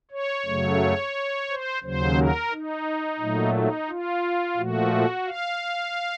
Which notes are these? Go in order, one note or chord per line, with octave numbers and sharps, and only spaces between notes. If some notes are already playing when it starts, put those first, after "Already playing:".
C#5
F#2 C#3 F#3 A3
C5
D#2 C#3 F#3 C5
A#4
D#4
A#2 F#3 A3
D#4
F4
A#2 F3 A3 F#4
F5